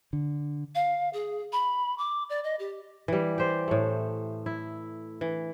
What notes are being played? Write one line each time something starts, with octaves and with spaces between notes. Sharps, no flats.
D3
F5
G#4
B5
D6
D5
D#5
G4
E3 G3
G4 C5 D5
A2 A3
E4
E3